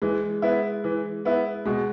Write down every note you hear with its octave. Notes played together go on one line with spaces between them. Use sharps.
E3 G#3
B3 E4
E3
B3 E4
B2 G#3